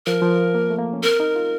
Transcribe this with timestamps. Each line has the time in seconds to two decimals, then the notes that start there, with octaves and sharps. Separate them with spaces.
0.06 F3 A#4
0.22 F3
0.55 A#3
0.70 A3
0.79 A#3
0.93 C#4
1.02 C4 A#4
1.20 D#4
1.36 F4